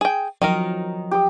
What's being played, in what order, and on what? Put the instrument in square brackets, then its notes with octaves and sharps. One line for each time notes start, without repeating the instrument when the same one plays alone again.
[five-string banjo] G#4 G5
[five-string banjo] D#3 D#4 A#4 [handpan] F3 F#3
[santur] G4 G5 D#6